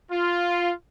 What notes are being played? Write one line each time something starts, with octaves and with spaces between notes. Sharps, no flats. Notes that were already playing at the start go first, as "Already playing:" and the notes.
F4